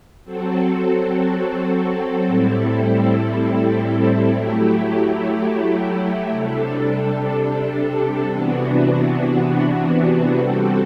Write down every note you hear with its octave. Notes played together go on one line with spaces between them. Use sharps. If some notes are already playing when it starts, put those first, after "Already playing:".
F#3 C4 F#4 A4
A2 G3 C4 E4 A4
F#3 A3 E4 G4
C3 G3 D4 A4
C3 E3 B3 D4 F#4
G3 C4 F#4 A4